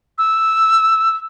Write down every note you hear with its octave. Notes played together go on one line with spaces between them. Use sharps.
E6